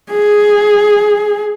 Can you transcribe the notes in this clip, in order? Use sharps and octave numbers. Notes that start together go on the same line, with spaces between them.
G#4